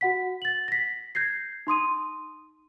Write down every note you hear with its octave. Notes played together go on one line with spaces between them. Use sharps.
F#4 F#5 B6
A6 F#7
A#6 B6
G6 G#6 A#6 C7
D#4 C6 D#6 D#7